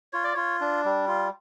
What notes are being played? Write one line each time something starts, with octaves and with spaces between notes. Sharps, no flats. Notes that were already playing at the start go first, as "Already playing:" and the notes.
F4 C#5
D5
F4 C#5
D4
G3
F4